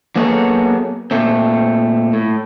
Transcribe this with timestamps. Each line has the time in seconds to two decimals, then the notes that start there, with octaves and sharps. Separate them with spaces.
0.16 F#3 A#3 B3 G#4 A4 C#5
1.11 A#2 A3 C4
2.13 A2